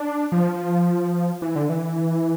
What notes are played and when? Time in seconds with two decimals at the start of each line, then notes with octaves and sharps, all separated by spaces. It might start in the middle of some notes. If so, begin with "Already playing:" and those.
Already playing: D4
0.32 F3
1.42 E3
1.56 D3
1.69 E3